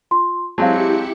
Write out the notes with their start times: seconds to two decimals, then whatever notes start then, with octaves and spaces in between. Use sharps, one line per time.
0.11 F4 C6
0.58 F#3 G#3 C4 E4 G4 F5 A5 C#7